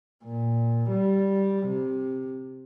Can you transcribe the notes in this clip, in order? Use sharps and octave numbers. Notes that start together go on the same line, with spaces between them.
A#2
G3
C3